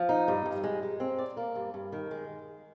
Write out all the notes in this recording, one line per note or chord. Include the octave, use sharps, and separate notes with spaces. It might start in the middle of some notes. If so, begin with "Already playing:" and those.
Already playing: F3
D#4
G2
G2
G#3
G#3
C4
D5
A#3
G2
G2
D#3
G#3